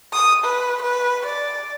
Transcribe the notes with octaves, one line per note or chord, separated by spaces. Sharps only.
D#6
B4
B4
D5